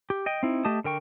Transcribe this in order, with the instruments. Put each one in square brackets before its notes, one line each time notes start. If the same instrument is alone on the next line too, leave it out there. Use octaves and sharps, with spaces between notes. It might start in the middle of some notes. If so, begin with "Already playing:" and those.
[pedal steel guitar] G4
D#5 G5
C4 D#4 E4
A3 G4 D#5 A5 D#6
D3 A#4 G5 C#6